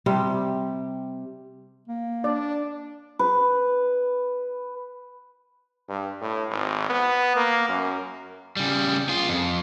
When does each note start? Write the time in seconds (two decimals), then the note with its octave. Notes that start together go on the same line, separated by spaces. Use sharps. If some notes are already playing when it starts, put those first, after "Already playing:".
0.06 C3 G3 G4
1.88 A#3
2.24 D4 D5
3.19 B4
5.89 G2
6.21 A2
6.50 G#1
6.89 B3
7.36 A#3
7.69 F#2
8.57 C#3 G3
9.09 F4 G#4
9.29 F2